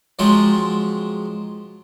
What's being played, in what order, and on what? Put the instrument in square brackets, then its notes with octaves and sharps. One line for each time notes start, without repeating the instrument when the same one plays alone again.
[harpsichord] F3 F#3 G#3 C4